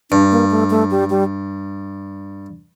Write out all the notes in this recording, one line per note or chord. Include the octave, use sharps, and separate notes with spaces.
G2 D4
A#3
A3
A3
G3
G3